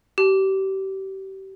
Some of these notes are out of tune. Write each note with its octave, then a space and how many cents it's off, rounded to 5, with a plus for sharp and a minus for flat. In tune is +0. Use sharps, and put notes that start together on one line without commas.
G4 -30